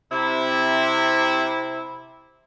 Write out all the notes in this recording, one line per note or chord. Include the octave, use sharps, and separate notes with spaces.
C3 E4